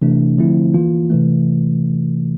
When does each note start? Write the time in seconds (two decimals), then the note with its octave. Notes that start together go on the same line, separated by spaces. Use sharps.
0.02 C3 E3 A3 D4
0.38 D3 F3 A3 C4 E4
0.74 E3 A#3 F4
1.10 C3 E3 A3